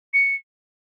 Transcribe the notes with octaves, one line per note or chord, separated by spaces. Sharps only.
C#7